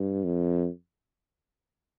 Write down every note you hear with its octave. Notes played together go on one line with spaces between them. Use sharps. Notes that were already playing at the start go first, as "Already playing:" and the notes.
Already playing: G2
F2